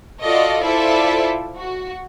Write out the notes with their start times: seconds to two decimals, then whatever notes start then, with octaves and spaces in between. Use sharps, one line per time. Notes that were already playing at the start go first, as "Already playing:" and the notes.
0.21 F4 F#4 A4 D5 D#5
0.62 E4 F4 A4 C5 D5 E5
1.57 F#4